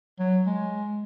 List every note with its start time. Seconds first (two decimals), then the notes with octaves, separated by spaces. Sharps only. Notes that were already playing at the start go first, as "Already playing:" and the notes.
0.20 F#3
0.47 G#3